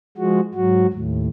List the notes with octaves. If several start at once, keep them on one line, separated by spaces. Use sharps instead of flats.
F3 G#3 F#4
G#2 F#3 F#4
D#2 A2